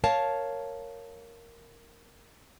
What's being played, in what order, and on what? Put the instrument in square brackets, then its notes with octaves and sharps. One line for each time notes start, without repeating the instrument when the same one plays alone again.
[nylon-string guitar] A#4 C#5 F5 A5